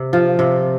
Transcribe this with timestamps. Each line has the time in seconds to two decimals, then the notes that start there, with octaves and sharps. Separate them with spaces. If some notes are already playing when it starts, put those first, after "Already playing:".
Already playing: C3
0.13 F3
0.39 C3